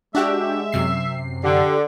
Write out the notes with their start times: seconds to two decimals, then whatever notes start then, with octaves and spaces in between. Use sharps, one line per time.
0.15 G#3 D4 F#4 G4 E5
0.72 F#2 C3 C7
1.44 D3 G4